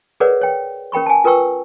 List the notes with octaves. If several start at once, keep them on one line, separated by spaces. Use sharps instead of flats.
G#4 A#4 B4 C#5 D5 F#5
C#5 G5
C#4 A#4 G5 B5 C#6
G#5 A5
F4 A#4 B4 G5 C#6 E6